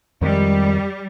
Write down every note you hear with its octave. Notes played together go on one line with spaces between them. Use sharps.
F2 D#3 G3 G#3